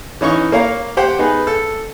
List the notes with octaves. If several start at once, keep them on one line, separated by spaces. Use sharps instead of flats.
E3 C#4 D#4 C#6
A#3 C#5 F5 A#5
G4 C5 F#5 G5
B3 D#4 G#4 B4
A4